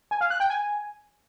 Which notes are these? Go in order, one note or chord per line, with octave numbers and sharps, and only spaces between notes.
G#5
F5
F#6
G5
G#5